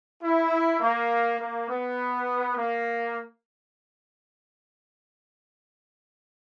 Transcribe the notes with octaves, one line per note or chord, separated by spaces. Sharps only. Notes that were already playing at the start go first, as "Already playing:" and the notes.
E4
A#3
A#3
B3
A#3